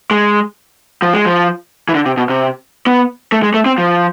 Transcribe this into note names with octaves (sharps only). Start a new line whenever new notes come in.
G#3
F3
G#3
F3
E3
D3
C3
B2
C3
B3
A3
G#3
A3
C4
F3